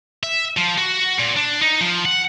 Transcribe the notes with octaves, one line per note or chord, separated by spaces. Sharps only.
E5
F3
F#4
A#2
D4
D#4
F3
F#5